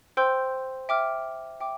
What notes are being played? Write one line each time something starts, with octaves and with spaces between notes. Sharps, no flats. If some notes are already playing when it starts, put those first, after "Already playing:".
C5 G5 C6 E6 G6
E5 G5 D6 F6
E5 G5 D6